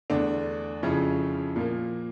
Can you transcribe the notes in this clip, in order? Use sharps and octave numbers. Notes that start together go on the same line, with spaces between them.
E2 D3 A3 D4
F2 C#3 F3 C#4 E4
A#2 F3 A#3